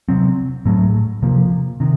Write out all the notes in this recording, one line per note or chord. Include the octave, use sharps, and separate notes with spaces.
C3 F#3 C4
A2 F#3 A3
C3 F3 A#3
C3 D#3